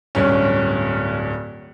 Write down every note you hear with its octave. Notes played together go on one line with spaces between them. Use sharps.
D1 G2 C#4